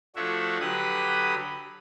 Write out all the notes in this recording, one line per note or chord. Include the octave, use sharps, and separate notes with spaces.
F3 A3 D4 F#4 C#5 E5
D3 F#3 G4 B4 B5 D#6